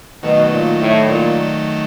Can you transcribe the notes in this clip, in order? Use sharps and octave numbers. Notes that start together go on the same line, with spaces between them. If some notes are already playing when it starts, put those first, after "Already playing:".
B2 D#3 F#3 A3
A#2
A2
A#2